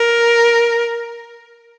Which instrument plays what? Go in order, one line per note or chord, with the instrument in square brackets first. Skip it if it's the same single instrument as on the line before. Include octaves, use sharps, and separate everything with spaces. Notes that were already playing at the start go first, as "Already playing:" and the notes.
Already playing: [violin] A#4